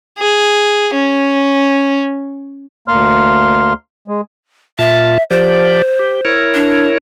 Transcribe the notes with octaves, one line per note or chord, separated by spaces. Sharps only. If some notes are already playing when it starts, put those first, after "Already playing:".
G#4
C#4
D2 A#3 C6 F6
G#3
A#2 F4 E5 A5
F3 G4 C5 D5
G4
E4 A#4 C#5
D4